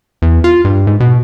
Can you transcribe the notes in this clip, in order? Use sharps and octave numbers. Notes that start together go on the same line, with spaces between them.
E2
F4
G2
G#2
B2